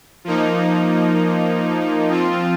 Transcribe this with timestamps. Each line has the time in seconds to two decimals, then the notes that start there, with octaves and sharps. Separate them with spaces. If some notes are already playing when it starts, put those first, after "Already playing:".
0.24 F3 A#3 D#4
2.08 F3 C4 F4